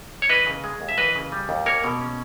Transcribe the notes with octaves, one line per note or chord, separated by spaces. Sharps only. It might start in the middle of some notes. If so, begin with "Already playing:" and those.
C#5
E3 B4 D#5
C#3
G#3
D#2
E5
E3 B4 D#5
C#3
G3
D#2
A#3 A#4 C#5
B2
C#4